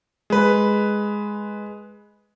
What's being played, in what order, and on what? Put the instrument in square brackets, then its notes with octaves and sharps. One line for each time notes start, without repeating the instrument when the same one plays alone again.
[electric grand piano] G#3 B4